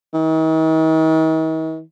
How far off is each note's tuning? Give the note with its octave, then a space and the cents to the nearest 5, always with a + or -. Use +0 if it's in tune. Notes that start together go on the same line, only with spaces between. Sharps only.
D#3 +45